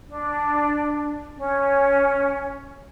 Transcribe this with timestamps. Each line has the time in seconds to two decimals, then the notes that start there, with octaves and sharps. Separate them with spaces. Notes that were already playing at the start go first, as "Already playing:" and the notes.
0.08 D4
1.37 C#4